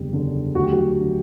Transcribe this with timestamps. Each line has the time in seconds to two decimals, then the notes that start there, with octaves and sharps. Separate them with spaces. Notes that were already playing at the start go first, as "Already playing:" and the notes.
Already playing: F#1 E2 D3 G3
0.13 F#1 E2 D3 G3
0.55 D2 D3 F#3 F#4
0.64 G4
0.72 F#3 F#4
1.00 D3 F#3